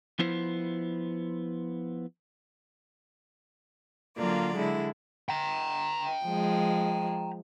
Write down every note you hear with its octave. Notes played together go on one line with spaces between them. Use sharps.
F3 B3 E4 C5
D3 F#3 A#3 F4 D5
D3 G#3 E4
G5 A#5
F3 G#3